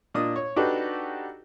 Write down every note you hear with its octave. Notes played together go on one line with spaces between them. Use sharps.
A#2 D4 D#5 D#6
C#5
D4 D#4 F#4 G4 A4 B4